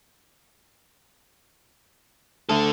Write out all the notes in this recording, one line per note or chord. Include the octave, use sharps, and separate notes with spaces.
D2 D3 A4